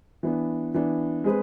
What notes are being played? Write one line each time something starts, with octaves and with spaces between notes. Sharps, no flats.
E3 B3 D4
E3 B3 D4
G#3 C4 G#4 B4